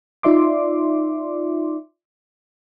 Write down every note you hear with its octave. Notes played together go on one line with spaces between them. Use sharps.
D#4 F4 D5 E5 C6 D6